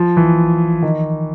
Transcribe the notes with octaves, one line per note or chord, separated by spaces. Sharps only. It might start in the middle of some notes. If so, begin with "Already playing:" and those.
Already playing: F3
E3
D#3